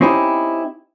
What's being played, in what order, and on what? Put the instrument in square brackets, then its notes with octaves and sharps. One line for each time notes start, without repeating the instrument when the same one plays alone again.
[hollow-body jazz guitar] C4 C#4 D#4 E4 G4